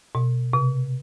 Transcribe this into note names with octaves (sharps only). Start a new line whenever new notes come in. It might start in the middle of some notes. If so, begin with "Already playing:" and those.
B2
C3